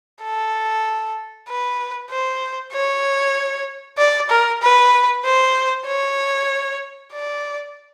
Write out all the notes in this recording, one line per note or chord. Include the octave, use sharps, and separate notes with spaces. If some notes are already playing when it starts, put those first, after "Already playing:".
A4
B4
C5
C#5
D5
A#4
B4
C5
C#5
D5